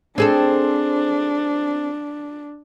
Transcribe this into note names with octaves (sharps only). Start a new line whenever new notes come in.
C4 D4 G#4 A4